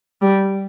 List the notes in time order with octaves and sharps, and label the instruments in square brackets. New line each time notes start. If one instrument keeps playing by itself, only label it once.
[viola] G3